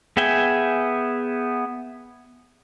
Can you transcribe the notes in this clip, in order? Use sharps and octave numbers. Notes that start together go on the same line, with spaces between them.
B3 G#4 E5 G5 G#5